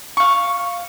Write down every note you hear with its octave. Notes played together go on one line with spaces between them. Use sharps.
F5 C#6